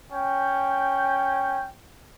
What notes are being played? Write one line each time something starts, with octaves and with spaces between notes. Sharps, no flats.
C#4 G5